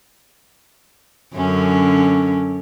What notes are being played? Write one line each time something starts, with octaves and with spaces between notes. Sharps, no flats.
F#2 D3 C#4